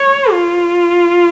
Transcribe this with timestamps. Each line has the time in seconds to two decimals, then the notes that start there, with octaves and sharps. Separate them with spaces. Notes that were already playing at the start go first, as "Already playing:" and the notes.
Already playing: C#5
0.32 F4